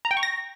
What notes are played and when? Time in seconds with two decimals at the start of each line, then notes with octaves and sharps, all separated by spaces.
0.05 A#5
0.11 G5
0.17 C#6
0.23 A#6